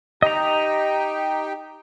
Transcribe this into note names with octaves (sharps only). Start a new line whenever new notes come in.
D#4 G4 D#5 G5 A#5